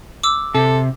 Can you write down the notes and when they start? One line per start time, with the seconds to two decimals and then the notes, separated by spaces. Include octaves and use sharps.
0.23 D6 E6
0.54 C3 A4